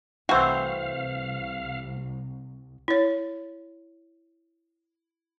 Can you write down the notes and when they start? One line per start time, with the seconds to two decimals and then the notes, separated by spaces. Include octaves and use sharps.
0.29 C2 E3 A3 C4 F#4 C5 F5
2.88 E4 C#5